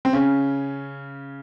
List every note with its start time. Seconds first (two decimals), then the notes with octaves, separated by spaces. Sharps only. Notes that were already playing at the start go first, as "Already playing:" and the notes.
0.05 C4
0.13 C#3 C#4